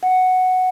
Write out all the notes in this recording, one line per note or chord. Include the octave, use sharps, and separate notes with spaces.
F#5